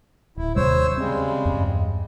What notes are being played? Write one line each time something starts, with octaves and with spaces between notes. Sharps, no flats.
D1 E4
D#2 C3 G3 C5 C#5 E6
C#3 G3 G#3 C4
E2 G2